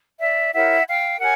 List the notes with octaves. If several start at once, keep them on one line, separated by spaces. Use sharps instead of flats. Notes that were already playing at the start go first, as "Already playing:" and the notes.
D5 E5
E4 G4 A#4 C#5 E5 F#5
F5 G5
G4 A#4 C#5 F#5 G#5